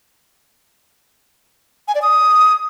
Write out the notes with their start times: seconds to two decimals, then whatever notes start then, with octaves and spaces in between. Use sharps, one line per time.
1.88 G#5
1.95 D5
2.02 D#6